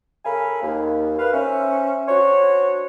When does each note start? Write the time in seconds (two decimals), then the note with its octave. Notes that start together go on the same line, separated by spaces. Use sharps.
0.25 C#3 A4 A#4 F5 G#5 B5
0.62 D#2
1.18 B4 F5
1.33 C#4 C5 E5
2.07 D4 F#4 C5 C#5